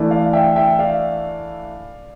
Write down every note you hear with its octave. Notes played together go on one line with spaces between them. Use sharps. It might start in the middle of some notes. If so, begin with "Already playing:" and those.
Already playing: E3 A3 D4
D5 F5
E5 G5
E5 G5
D5 F5